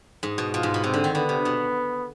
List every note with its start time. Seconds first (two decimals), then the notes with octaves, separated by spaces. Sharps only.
0.23 G#2
0.38 B2
0.54 B2 F4
0.63 G#2
0.74 B2
0.84 C3 C4
0.94 D3
1.04 D#3
1.14 D3 B3
1.29 C3
1.45 B2